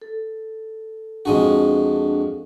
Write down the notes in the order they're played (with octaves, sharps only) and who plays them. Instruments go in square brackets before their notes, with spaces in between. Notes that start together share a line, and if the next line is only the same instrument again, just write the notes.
[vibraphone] A4
[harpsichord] F2 G#3 F#4 [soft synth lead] D4